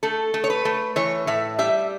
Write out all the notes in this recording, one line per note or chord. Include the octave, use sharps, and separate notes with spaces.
A3 A4
A3
C#5
B4
A3
E3 C#5
A2 E5
G3 E5